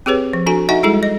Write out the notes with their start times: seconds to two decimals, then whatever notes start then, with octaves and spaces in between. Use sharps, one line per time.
0.06 C4 G4 G#4 B4 C#5
0.33 F3
0.46 D4 F#4 A4 G#5
0.69 D#4 F#4 D#5 E5 F#5 G#5
0.83 G3 G#3 E4 G#4 A4
1.03 D#5